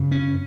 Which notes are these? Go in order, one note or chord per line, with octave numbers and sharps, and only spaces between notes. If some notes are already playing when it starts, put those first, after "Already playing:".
Already playing: F#2 C#3
C#4